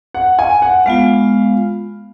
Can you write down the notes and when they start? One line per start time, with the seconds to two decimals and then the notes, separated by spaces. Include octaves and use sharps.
0.14 F#5
0.39 G#5
0.62 F#5
0.86 G#3 B3 F4 F5